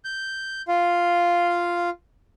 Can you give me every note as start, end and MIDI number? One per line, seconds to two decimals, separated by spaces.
0.05 0.62 91
0.68 1.90 65
0.68 1.90 77